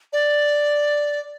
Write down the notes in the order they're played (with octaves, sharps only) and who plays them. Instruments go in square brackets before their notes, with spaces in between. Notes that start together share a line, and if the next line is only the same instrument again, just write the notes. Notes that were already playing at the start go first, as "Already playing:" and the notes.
[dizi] D5